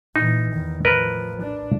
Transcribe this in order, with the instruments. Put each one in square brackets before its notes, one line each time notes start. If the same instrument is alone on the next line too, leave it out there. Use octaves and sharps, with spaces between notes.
[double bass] A#2 E3 [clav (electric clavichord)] D#4
[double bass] E2 D#3
[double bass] A2 F3 [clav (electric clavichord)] A#4 B4 D#5
[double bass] D4